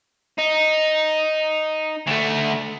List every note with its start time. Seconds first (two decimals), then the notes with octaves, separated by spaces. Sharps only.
0.39 D#4
2.07 D2 A3